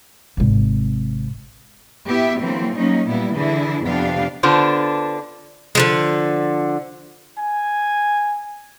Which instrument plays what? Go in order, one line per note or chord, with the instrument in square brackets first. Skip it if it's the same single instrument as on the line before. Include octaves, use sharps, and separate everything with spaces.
[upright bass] G#1 C3
[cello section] B3 E4 G4 E5
D3 E3 F#3 A#3 C4
F#3 G3 A#3 C#4 D#4
A#2 G3 A#3 B3 E4
D3 E3 D4 E4 G#4
F2 C3 B3 D4 G4 F5
[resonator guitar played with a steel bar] D3 B3 D4 F4 C5
[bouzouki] D3 F3 G#3
[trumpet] G#5